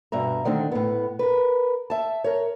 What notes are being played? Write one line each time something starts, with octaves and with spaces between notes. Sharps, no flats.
G2 B2 E5 A#5
D3 D#3 A3 C4 D4
A2 B3
A#4 B4
E5 A5
A#4 C#5